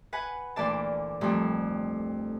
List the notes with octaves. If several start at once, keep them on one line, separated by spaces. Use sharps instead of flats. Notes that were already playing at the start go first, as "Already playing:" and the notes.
B4 F#5 G#5
D2 A#2 E3 D5 A5
F2 A#2 G3 A3